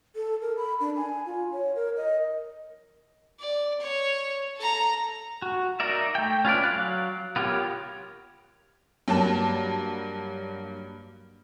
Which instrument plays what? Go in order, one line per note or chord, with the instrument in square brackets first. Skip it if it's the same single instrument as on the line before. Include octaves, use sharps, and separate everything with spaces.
[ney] A4
A#4
B5
D4
G#5
F4
C#5
A#4
D#5
[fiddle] D5
C#5
A4 A#5
[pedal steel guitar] F#4
D#4 A#4 D5 E5
A3 G5
C#4 F4 B4 D5
F#3 F5 F#6
B3 F4 G4 A#4 C#5
[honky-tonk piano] G2 F#3 A#3 A5